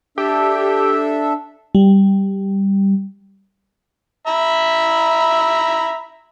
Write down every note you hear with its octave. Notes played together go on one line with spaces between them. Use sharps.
D4 G4 A4 E5
G3
E5 A#5 B5